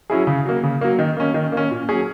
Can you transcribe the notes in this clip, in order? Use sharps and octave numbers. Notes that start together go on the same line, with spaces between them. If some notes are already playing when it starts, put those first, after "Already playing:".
F#3 C#4 E4 G#4
C#3
F#3 A#3
C#3
F#3 A#3
D#3
A#3 C#4
D#3
A#3
C#4
A#2
F#3 C#4 G#4